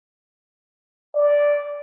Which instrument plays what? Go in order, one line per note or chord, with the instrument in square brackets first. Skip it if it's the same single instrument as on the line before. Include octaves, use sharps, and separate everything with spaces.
[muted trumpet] D5